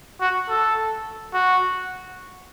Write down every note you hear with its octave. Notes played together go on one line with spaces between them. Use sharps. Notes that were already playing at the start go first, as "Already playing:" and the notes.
F#4
A4
F#4